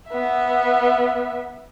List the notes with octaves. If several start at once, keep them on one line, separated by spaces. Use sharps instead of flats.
B3 E5